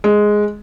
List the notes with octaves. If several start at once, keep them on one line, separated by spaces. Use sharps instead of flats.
G#3